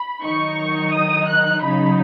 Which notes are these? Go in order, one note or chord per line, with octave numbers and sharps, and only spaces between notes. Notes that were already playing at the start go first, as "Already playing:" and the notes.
Already playing: B5
D#3 F#3 D#4 C#6
D#6
F#6
C#3 F#3 D#4 B5